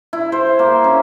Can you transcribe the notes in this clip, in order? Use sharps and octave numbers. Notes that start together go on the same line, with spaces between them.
E4
C5
A#3
C#4